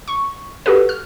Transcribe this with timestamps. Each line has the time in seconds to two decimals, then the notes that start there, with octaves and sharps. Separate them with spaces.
0.08 C#6
0.66 F#4 G4 A4 B4
0.89 F6